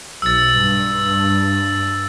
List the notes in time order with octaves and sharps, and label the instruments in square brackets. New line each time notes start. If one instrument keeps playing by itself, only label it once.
[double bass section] B1 [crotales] E6 A6
[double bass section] G2